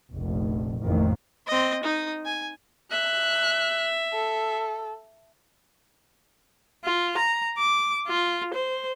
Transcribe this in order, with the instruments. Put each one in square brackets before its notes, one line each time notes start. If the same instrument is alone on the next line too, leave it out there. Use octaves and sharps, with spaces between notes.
[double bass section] F1 A#1
A1 F2 D#3 A#3
[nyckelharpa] C4 D#5
D#4 D#6
G#5
[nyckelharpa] E5 [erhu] F#6
[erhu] A4
[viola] F4
A#5
D6
F4
C5